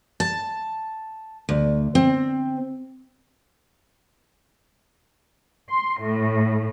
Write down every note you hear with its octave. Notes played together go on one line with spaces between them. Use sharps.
A5
D2
C4
C6
A2